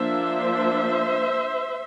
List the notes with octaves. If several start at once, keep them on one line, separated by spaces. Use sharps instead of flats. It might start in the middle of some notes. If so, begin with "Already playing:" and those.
Already playing: F3 A#3 D4 C5 E5